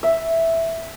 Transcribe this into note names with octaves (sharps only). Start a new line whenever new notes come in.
E5